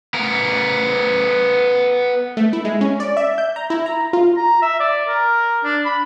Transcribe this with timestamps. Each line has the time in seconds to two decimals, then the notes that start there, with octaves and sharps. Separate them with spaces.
0.14 B3 A#4
2.37 A3
2.53 E4
2.65 G#3
2.81 C#4
3.00 D5
3.17 E5
3.38 G6
3.56 A#5
3.70 E4
3.86 A#5
4.13 F4
4.37 A#5
4.62 E5
4.80 D5
5.08 A#4
5.64 D4
5.86 B5